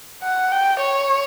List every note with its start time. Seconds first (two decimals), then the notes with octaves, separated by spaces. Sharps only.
0.23 F#5
0.52 G5
0.81 C#5